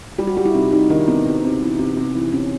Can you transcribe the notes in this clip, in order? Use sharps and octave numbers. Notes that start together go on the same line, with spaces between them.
G3 G4
F#4
G3 F4
E4
C3 D#4
G3 D#4
D#3 D4
C3 B3
C3 C4
C3
E3
C3
C3
E3
C3 C#4